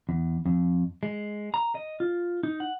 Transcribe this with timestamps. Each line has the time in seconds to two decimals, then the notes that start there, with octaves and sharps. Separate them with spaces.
0.09 E2
0.46 F2
1.03 G#3
1.54 A#5
1.75 D#5
2.00 F4
2.43 D#4
2.60 F#5